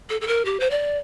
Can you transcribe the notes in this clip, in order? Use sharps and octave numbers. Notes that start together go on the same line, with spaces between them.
A4
A4
A#4
G4
C5
D5